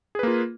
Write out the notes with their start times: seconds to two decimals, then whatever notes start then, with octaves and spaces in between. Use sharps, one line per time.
0.15 G#4
0.19 B4
0.23 A#3
0.27 F4